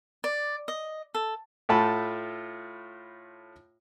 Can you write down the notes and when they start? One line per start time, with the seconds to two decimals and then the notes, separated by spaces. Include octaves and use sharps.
0.24 D5
0.68 D#5
1.15 A4
1.69 A2 A3 F4 A5 B5